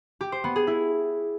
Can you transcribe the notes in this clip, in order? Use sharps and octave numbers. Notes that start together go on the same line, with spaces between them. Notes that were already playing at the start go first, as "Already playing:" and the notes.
G4
C5
B3
G#4
E4